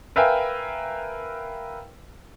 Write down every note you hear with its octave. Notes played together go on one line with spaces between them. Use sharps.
A#4 B4 E5 F5 G5 G#5